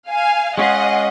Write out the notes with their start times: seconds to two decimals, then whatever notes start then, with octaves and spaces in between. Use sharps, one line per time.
0.10 F5 G#5
0.57 G#3 C#4 F4 G#4 D#5 F#5